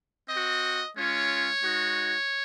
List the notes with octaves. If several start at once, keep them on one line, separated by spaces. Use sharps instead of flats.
C4 F#4 D#5
G#3 C#4 F4 C#5
G#3 D#4 F#4